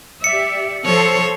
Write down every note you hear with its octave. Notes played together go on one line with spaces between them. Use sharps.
G4 D5 E5 C#7
F3 A4 C5 C#5